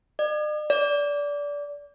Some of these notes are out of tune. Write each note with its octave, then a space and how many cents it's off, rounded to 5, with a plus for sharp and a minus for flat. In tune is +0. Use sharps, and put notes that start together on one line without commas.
D5 +45
D5 -20